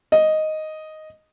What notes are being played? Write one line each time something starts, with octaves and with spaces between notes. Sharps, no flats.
D#5